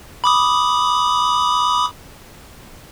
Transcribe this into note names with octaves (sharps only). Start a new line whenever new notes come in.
B5 D6 D#6